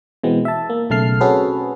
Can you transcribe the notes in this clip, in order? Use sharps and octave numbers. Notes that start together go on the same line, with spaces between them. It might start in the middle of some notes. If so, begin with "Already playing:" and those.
B2 E3 G#3 B3 C4
E5 A5
A#3
B1 C#3 A3 A5 F6 C7
C4 C#4 F#4 G#4 A4 B4